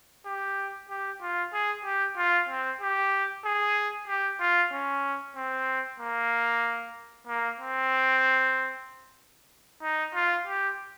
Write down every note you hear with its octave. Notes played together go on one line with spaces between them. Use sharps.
G4
G4
F4
G#4
G4
F4
C4
G4
G#4
G4
F4
C#4
C4
A#3
A#3
C4
D#4
F4
G4